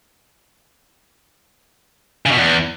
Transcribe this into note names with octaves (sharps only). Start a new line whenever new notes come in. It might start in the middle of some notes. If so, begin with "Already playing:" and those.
C#3
B2
E2